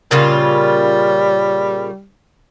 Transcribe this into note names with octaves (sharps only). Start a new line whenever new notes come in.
A#2 C#3 G3 F4